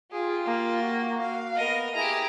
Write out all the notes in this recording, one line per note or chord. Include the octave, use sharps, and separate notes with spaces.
F4 G4 G#4
A#3
F#4
F5
B3 A#4 D#5
E4 G4 G#4 A#5